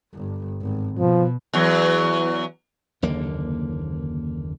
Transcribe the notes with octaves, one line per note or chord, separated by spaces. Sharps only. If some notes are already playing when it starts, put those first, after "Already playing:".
G1
G#1
B2 F3
E2 F#3
F#1 D#2 D3 A#3